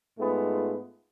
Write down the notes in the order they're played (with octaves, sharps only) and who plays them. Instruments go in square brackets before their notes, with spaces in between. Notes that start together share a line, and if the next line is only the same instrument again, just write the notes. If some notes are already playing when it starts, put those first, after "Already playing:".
[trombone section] G#2 G#3 A3 B3 F4